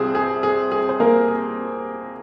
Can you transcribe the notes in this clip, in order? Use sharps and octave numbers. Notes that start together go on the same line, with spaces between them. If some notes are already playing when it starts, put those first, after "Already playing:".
Already playing: C2 C3 G3 C4 F4 G#4
G#4
G#4
G#4
C5
A#3 A#4
G#4